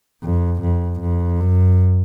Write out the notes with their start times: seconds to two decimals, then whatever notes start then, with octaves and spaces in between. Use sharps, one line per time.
0.23 F2
0.62 F2
1.01 F2
1.40 F#2